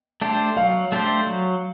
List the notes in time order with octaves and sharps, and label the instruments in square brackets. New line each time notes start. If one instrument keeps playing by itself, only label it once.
[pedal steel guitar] A3 D4 G4 C5
[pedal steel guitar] F#3 [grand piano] F5
[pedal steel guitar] A3 D4 G4 C5
F#3